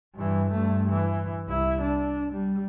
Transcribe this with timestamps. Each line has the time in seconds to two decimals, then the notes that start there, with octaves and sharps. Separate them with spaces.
0.15 G2 E3
0.50 G2 A3
0.90 E3
1.46 C2 E4
1.81 D4
2.32 G3